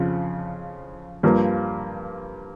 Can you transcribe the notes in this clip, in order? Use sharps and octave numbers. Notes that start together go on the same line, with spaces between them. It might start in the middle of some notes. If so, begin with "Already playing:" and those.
Already playing: F2 C#3 F3
G2 F3 A#3